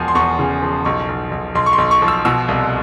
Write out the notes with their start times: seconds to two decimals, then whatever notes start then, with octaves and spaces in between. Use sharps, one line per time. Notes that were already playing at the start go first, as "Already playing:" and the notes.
Already playing: E1 E2 F3 G#5
0.08 C6
0.15 E2 C#6
0.39 C#3
0.62 F3
0.85 B1 C#6
1.08 B1
1.31 B1
1.55 B1 C6
1.66 C#6
1.73 C6
1.78 B1
1.91 C#6
2.02 F3
2.08 E6
2.25 B2 E6
2.48 C2